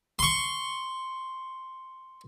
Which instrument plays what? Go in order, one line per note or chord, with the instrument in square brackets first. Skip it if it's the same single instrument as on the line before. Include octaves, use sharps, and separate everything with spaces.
[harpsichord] C6 C#6